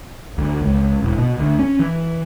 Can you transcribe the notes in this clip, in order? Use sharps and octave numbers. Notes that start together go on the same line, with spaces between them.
D2
C#2
E1
B2
D2
C#4
E3